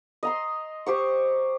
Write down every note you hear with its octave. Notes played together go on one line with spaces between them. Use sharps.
D#5 A#5 C6
G4 C5 C#6